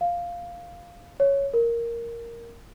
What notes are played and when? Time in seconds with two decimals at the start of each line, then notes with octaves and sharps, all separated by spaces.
0.01 F5
1.20 C#5
1.54 A#4